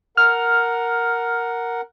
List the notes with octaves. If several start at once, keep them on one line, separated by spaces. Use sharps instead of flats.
A#4 F#5 F6